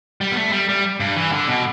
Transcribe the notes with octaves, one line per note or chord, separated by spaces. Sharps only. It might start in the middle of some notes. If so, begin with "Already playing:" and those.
G3
B3
A3
G3
G3
G2
E3
D3
B2